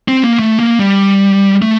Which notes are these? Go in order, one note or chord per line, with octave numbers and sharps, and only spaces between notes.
C4
A#3
A3
A#3
G3
A3